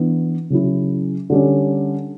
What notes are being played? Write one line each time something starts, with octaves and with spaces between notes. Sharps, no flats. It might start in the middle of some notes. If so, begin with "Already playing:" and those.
Already playing: E3 B3 D4
C#3 F#3 C#4 E4
D3 G3 C#4